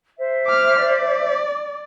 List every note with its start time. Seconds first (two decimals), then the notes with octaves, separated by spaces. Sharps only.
0.17 C5 E5
0.47 D6 F6
0.80 D5